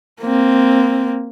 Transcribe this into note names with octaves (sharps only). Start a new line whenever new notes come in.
A#3 C4